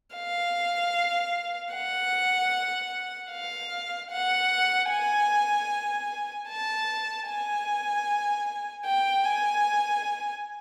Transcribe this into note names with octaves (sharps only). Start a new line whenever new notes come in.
F5
F#5
F5
F#5
G#5
A5
G#5
G5
G#5